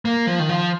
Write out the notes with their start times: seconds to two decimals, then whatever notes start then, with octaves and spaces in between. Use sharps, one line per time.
0.05 A#3
0.27 F3
0.39 D#3
0.49 F3